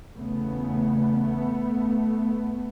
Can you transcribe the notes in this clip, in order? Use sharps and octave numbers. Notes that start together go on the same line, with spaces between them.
E2 C#3 A3 B3